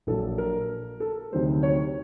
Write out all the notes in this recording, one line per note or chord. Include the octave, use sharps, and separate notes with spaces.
A#1 A#2 F#3 A4
A#4
A4
D2 C3 D#3 F#3 C5
C#5